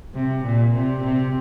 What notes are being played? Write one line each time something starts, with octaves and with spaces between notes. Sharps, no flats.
C3
A#2
C3
C3